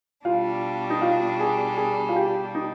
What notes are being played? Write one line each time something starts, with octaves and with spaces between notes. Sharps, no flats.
B2 G3 D4 F4
D#4
F4
G#4
G#4
F4
G4
D#4